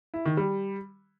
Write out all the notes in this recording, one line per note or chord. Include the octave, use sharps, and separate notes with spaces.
E4
D#3
G3